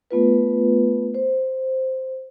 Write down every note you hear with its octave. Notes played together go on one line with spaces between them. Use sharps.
A3 B3 F4 B4
C5